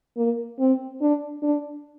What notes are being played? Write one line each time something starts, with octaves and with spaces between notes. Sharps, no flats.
A#3
C4
D4
D4